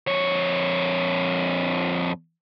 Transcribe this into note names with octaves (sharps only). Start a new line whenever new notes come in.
F2 C#5